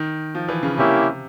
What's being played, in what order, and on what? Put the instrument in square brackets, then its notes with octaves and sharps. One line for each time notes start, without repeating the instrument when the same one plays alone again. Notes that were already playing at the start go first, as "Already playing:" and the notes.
Already playing: [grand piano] D#3
F3
E3
C#3
[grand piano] C3 [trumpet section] A#3 C#4 E4 G4